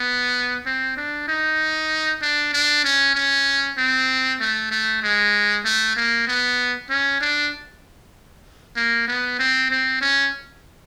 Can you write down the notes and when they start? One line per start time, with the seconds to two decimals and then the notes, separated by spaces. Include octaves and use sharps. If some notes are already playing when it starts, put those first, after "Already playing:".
Already playing: B3
0.66 C4
0.97 D4
1.28 D#4
2.22 D4
2.53 D4
2.85 C#4
3.15 C#4
3.78 C4
4.40 A3
4.71 A3
5.03 G#3
5.65 A3
5.96 A#3
6.27 B3
6.90 C#4
7.21 D4
8.76 A#3
9.08 B3
9.39 C4
9.71 C4
10.02 C#4